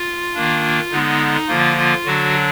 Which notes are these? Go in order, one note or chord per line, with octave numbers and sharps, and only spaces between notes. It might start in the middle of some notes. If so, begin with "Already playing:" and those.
Already playing: F4
D#3 A#3 D4
D3 G#3 B3 D#4
D3 F3 A#3 F4
F4
D3 F#3 D4 F#4